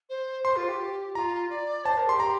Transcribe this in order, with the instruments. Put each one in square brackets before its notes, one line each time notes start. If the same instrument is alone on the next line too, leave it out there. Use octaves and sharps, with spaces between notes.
[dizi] C5
[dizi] C5 [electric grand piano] C6
[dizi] F4
G4
[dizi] F4 [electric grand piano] A#5
[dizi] D5
[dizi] C5 [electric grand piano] A5
[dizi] A#4
[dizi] G4 [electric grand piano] C6
[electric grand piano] A#5